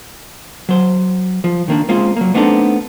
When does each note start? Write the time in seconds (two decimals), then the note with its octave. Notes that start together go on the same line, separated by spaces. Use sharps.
0.69 F#3 C5
1.44 F3
1.68 D#3 A#3 D4
1.89 G#3 A#3 C4 C#4 F4 C5
2.17 F#3 A#3
2.34 A3 B3 C4 D4 D#4 A4